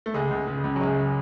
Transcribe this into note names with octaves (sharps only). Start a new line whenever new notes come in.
A3
C#2 G#3
C#2
C#3
C#2
F#3
F#2 G#3